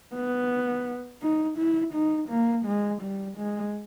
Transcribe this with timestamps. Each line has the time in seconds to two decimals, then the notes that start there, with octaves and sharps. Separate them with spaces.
0.14 B3
1.21 D#4
1.58 E4
1.94 D#4
2.29 A#3
2.65 G#3
3.02 G3
3.38 G#3